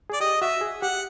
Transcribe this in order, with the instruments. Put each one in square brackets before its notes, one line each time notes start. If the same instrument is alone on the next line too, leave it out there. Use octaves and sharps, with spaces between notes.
[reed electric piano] G#4 [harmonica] D5
[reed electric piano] G4 [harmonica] D#5
[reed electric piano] F#4 [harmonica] E5
[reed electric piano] G#4
[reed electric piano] G4 [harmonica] F#5